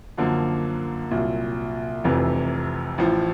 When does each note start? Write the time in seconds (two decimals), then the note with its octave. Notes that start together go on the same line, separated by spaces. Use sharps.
0.18 F#2 D3 F3 A#3
1.11 C2 A#2 F#3
2.04 F1 F2 C3 E3
2.98 A1 A2 F3